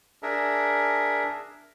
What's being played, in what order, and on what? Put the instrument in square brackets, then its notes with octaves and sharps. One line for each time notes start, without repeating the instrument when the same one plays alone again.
[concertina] D4 G#4 A#4 E5